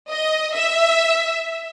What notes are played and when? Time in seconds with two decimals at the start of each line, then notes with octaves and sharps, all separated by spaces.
0.10 D#5
0.55 E5